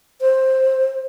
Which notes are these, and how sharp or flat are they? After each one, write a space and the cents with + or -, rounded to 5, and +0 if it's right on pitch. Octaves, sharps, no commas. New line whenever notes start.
C5 +10